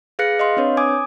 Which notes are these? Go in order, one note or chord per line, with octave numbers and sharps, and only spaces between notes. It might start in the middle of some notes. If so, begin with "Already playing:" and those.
G#4 B4 F5 F#6 A#6 C#7
D#5 F5 C6
C4 D4 B4 C#5
G#5 D6 D#6 G#6